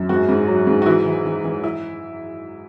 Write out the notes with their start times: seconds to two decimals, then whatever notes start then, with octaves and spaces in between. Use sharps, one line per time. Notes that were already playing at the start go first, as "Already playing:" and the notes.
Already playing: F#2
0.09 G#2 F#4
0.29 G#2
0.48 F#3
0.67 G#2
0.82 F#4
0.86 E3 E4
1.06 E3
1.25 E3
1.44 E3
1.64 E4